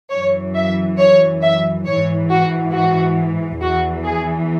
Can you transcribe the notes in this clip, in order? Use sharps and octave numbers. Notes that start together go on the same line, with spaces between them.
F#2 E3 C#5
E5
C#5
E5
G#2 E3 C#5
F#4
F#4
E2 E3 F#4
G#4